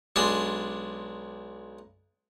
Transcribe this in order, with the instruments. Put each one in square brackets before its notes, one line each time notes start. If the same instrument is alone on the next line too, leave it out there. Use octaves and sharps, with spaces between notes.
[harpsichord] B1 G#3 D4 C6